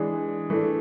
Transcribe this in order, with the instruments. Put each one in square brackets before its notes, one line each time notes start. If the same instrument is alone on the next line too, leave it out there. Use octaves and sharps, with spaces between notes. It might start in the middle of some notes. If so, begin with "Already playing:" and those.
Already playing: [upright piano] E3 G#3 D4 G#4
E3 A3 D4